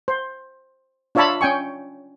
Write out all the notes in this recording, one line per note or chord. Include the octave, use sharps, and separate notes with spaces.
C5
D4 F4 C#5 E5 A5 B5
C#4 G5 G#5 C#6